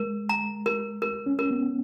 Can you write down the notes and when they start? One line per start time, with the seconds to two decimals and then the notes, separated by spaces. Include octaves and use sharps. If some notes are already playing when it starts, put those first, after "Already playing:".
Already playing: G#3 A#4
0.29 A#5
0.66 A#4
1.02 A#4
1.26 C#4
1.39 A#4
1.51 B3